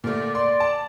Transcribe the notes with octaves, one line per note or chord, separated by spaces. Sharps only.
A#2 D3 A3 A#4 D5
D5 C6
A5